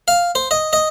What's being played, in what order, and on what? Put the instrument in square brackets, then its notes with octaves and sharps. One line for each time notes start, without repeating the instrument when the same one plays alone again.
[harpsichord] F5
C5
D#5
D#5